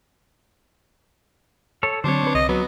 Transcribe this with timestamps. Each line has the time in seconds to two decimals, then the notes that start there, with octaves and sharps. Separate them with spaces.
1.83 A4 C#5
2.04 D3 F#3 C4 D4 C5 C#5
2.23 C4 B4
2.35 C2 D#5
2.49 F#3 B3 B5